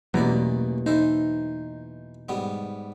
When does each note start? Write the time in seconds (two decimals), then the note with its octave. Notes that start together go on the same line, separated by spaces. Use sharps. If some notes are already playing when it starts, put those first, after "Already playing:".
0.14 A1 E2 B2 E3 F#3 A#3 D5
0.86 E3 D#4 A4 C5
2.29 G#2 G3 B3